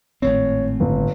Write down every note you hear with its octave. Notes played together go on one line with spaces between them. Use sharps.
G#1 A2 C4 C#5
G1